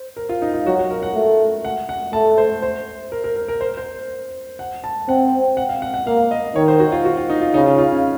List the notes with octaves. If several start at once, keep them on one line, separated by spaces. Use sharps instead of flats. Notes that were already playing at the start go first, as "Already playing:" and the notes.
Already playing: C5
A#4
F4
D#4
F4
F#3 F#4
F#4
A#4
F#5
A3
F#5
F#5
A3 A5
C5
C5
A#4
A#4
A#4
A#4
C5
C5
F#5
A5
C4 F#5
F#5
F5
F#5
F#5
A#3 F5
D#5
D#3 C#5
C5
F#4
F4
F#4
F4
D#4
F4
C#3 D#4
F4
F4
C#4